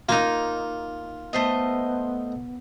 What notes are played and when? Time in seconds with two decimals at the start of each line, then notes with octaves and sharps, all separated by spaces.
0.09 A#3 D#4 F4
1.33 A3 B3 C5 D#5